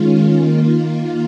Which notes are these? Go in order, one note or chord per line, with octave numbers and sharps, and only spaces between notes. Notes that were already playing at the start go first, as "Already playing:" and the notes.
Already playing: D#3 G#3 C#4 F4
D#3 A#3 F4